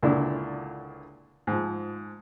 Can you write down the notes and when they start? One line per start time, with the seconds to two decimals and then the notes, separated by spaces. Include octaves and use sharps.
0.03 C#2 A#2 D3 D4 E4
1.47 G#2 F3